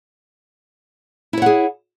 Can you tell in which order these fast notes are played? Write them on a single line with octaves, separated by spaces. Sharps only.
E4 C#5 F#5 G#4